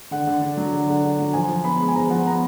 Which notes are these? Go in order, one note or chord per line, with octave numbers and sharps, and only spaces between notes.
D3 F#5
D3
D4
F#3
D3
D3
D4
F#3
F3 G#5
F3
B3 B5
G#3
G#5
F3 A#5
F3 F#5
B3 A#5